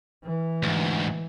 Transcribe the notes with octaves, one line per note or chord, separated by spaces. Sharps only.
E3
D2 G#2